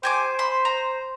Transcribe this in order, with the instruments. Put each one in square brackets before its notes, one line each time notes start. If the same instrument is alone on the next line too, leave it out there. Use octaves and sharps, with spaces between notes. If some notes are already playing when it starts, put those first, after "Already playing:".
[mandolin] G4 G#5 D6 [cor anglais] C5
[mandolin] B5 C6
A#5